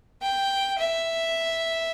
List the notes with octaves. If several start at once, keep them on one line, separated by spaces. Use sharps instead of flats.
G5
E5